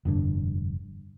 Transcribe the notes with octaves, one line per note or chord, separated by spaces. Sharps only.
F1 G2 D3